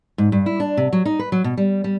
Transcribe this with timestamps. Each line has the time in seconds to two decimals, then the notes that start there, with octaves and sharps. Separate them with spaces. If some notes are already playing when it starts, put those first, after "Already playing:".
0.18 G#2
0.32 G2
0.46 E4
0.60 D4
0.77 C3
0.93 F#3
1.05 D#4
1.19 B4
1.32 F#3
1.44 B2
1.57 G3
1.84 G3